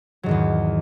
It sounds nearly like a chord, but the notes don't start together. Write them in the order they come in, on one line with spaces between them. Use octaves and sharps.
F#3 G#2 D#3 E2